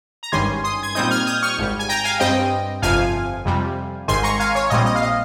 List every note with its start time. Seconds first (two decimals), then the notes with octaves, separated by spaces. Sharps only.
0.23 A#5
0.32 G#1 G2 D#3 G3 C#4 G#5 C6
0.64 C6 D#6
0.83 G#6
0.95 A#2 G3 C4 D#4 D#6 G6
1.10 F6 G#6
1.27 D#6 G6
1.42 C#6 F6
1.58 G#1 G#2 G3
1.79 G#5
1.89 G5 A#5
2.04 F5 G#5
2.20 G2 G3 C4 D#5 G5
2.82 G1 F2 C3 F3 F5 G#5
3.45 F2 C3 G3
4.08 G#1 G#2 D#3 G#5 C6
4.23 A#5 C#6
4.40 F5 G#5
4.55 C#5
4.70 A#1 A#2 G3 C4 D#5
4.86 D#5
4.96 F5
5.02 D#5